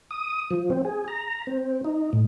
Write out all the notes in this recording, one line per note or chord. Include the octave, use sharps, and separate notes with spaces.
D#6
F3
C4
G#4
A#5
C4
D#4
A2